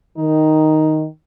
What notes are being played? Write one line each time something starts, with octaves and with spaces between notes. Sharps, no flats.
D#3 D#4